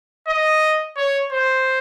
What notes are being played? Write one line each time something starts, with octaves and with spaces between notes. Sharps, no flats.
D#5
C#5
C5